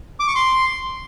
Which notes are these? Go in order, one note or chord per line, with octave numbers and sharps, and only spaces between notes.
D6
C#6
C6